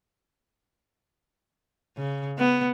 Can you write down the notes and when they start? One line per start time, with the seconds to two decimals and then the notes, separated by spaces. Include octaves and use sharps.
1.97 C#3
2.38 B3